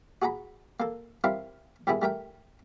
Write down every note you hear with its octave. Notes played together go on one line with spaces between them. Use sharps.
F#4 G#4 F#5 A#5 B5
A#3 A4
G3 C4 E4 A#4 F5
G#2 D#3 G3 B3 E4 G#4
G3 A3 A#4 G5